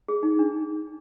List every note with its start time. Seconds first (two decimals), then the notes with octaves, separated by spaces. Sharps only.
0.08 G#4
0.23 D#4
0.39 D4